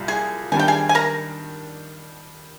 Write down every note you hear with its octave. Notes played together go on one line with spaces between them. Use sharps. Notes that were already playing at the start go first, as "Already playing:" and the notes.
Already playing: C2 A#2 G3 F4
G#4 G#5
D#3 G3 D4 G#5
G5
G#4 G#5
G#5
A#4 A#5